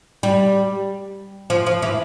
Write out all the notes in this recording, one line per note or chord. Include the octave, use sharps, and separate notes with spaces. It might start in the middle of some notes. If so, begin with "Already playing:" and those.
G3
F3
F3
E3